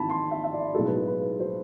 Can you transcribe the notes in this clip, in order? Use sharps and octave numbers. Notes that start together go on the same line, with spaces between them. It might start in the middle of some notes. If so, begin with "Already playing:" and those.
Already playing: G#1 G#2 E3 A5 B5
C6
E5
E5
D5
B1 A2 G#3 A4
B4
A4
B4
C5